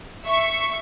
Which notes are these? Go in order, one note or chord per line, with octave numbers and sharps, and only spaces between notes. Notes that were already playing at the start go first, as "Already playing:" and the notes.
E5 C#6